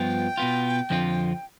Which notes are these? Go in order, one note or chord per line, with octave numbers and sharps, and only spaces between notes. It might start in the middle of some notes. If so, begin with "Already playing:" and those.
Already playing: G2 F3 B3 F4 G5
B2 B3 F4
F2 D3 F3 C4 F4